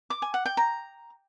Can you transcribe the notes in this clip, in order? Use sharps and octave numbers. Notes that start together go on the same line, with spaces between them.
D6
G#5
F#5
G5
A#5